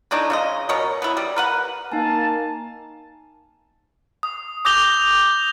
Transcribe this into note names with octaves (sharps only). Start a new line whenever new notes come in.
E3 A3 D4 D#4
C#3 G#3 D#5
B2 A#4 C#5 D#5
B3 E4
G3
A#4 B4 F#5
A#3 D#4 F5 G#5 A5
D#6
D6 D#6 G6 A#6 F7 G7